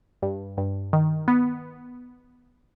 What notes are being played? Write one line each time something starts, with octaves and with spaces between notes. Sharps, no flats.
G2
G2
D#3
B3